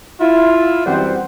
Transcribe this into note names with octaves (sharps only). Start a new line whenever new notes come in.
E4 F4
F#2 E3 G3 C4 C5 F#5